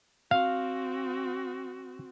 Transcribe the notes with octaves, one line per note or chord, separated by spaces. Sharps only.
C4 F#4 F5